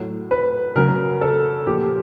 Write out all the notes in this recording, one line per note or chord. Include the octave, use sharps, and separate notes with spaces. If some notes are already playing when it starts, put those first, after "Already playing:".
Already playing: A2 F#3
B4
C#3 F#3 A#4
A4
A#2 F3 G4